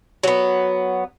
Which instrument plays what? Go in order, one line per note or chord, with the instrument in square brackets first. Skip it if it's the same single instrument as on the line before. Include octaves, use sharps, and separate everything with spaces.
[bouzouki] F#3 B3